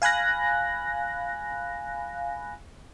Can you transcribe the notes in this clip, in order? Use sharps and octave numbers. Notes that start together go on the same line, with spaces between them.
F5 G#5 B5 F#6 A#6